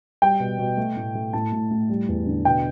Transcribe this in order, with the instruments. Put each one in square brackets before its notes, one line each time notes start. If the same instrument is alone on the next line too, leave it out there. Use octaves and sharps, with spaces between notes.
[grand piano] G3 G5
B2
B2
A3
A2
A3
A2 A5
A2
A2
G3
E2
D3
B2 G5